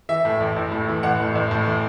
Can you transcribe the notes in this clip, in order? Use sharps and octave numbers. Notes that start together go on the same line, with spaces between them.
E3 E5
A2
A1
A1
A2
E3
A1 F#5
A2
A1
A2
E3